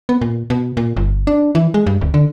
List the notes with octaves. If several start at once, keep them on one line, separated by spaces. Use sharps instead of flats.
B3
A#2
B2
A#2
G1
D4
E3
G#3
G2
D1
D3